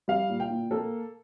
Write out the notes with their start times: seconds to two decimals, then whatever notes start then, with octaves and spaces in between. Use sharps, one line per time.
0.08 G3 F5
0.29 A#2
0.40 G5
0.50 A#2
0.71 A#3 A4